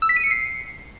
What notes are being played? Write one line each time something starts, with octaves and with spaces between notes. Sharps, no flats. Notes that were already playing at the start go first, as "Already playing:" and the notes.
E6
B6
D#7
C#7
C7